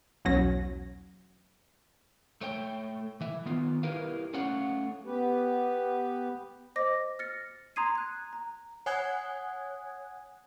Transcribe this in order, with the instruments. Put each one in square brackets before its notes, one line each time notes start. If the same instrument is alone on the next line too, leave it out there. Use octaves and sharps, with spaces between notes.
[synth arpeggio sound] B1 E2 F#3 C#4 A#6
[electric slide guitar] A3 C#5 G5
E3 E5
D#3 B3 F4
E4 G4 A#4 B4 F5
A3 C#4 C#5 F5 F#5
[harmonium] B3 G4 B4
[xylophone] C5 D#5 D6 A#6
F6 A6 A#6 C#7
A#5 C6 D#6 G#6 C7 D#7
F#6 G#6
A#5
[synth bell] C#5 F#5 G#5 D#6 F#6 G#6